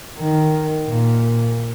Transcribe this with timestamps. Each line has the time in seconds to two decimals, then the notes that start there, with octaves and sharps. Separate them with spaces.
0.18 D#3
0.88 A#2